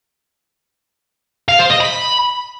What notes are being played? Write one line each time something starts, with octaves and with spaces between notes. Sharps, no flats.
F5
C5
D#5
B5